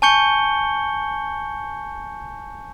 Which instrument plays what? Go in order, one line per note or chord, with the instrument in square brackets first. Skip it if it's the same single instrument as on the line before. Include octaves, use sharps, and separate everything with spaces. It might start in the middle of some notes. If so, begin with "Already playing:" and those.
[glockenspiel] G#5 A5 C#6 G6 C#7 G7